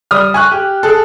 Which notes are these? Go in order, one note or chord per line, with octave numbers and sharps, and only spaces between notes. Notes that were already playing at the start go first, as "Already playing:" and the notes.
G3 D#6 F6
G#5 C#6 F#6
G4
G#4 A4